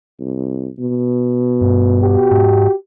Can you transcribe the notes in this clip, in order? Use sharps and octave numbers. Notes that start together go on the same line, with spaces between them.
C2
B2
G2
F#4 G4
G#2